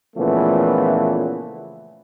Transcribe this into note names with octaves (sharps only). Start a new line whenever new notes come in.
A#2 C#3 E3 F3 A3 B3